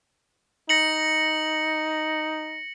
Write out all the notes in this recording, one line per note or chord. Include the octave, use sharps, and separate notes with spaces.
D#4 A#6 C#7 F#7